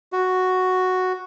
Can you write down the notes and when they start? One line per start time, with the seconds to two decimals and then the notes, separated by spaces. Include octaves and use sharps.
0.13 F#4